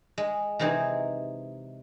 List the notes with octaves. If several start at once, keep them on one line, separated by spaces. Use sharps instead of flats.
G#3
C3 E3 C4 D#4 G#4